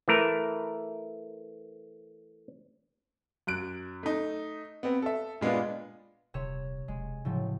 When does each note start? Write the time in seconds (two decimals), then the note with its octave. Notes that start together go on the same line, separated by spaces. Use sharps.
0.08 E3 A3 A#4
3.47 F#2 F#6 D7
4.03 A3 D#4
4.83 B3 C4
5.02 A4 E5
5.41 A#2 G#3 B3 D4 F4
6.34 D#1 C3 C#5 E7
6.88 E1 G#3
7.25 A2 C#3 F3 F#3